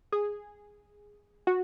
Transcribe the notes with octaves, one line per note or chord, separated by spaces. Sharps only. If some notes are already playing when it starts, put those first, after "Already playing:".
G#4
F#4